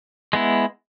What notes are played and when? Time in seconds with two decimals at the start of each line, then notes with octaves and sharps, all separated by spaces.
0.33 G#3 B3 E4